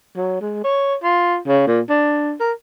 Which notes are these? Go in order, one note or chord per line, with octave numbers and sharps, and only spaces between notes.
F#3
G#3
C#5
F4
C#3
A#2
D4
A#4